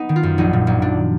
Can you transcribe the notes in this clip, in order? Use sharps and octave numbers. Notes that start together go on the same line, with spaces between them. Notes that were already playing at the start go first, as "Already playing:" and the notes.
Already playing: B3 D#4
D#3
F4
F#2
A#1 D#4
A#2
A#1
A#2 D4